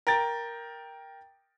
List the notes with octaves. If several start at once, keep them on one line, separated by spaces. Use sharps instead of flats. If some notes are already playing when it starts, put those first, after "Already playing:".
A#4 G5 A6